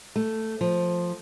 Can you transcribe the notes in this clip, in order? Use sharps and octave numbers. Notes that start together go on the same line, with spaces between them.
A3
F3